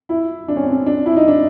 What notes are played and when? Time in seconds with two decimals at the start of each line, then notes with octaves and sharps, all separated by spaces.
0.09 E4
0.48 D4
0.56 C#4
0.63 C4
0.71 C#4
0.86 D4
1.06 E4
1.16 D#4
1.28 D4